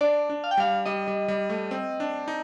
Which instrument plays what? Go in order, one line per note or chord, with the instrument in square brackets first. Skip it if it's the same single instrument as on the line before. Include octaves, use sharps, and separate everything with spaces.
[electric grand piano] D4 [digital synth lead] D5
[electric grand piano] D4
[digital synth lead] F5
G5
[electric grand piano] G3 [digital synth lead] F5
[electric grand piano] G3 [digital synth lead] D#5
[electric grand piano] G3
G3
A3
C4
D4
D#4